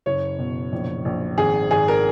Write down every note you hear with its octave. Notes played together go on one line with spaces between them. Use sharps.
F#1 C#5
B2
A#1
A#1
G#1 G#4
G#1 G#4
A#4